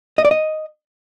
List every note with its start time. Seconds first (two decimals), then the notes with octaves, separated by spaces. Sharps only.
0.18 D#5
0.25 D5
0.31 D#5